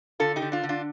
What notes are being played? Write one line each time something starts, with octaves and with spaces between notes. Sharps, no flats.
D3 F4 A4
D#4 G4
D3
D4 F4
D3
D4 F4